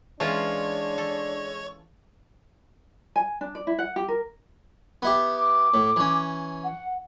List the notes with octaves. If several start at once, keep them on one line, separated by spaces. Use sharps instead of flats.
E3 G#3 C#4 D4 F4 C#5 A5
A4
G#5
D4
D5
E4
F#5
G4
A#4
B3 E4 G4
D6
A2
E3 C#4
F#5